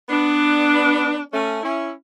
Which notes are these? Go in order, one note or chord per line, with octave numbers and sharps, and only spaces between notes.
B3 D4
A3 C#4
C#4 E4